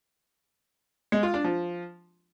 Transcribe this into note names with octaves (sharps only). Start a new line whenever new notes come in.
G#3
F4
D4
F3